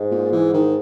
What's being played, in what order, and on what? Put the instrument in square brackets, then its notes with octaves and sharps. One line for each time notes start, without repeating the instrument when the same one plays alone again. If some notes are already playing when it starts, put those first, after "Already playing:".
Already playing: [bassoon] G#2
[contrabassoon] A#2
E3
D#3